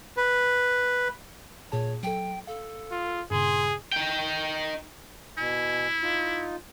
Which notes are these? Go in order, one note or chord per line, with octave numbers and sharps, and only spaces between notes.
B4
A#2 G#4 C#5 A5
F#3 A4 G5
A4 F5
F4
G2 A#2 C#3 G#4 C6
D#4 G5
B2 E4 G#5
D#4 F4